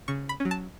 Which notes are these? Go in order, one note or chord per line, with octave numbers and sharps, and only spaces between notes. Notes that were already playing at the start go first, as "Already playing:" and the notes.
C#3 C#6
B5
C#4
F#3
A5